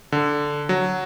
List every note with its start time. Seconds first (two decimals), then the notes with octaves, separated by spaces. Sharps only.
0.12 D3
0.69 F#3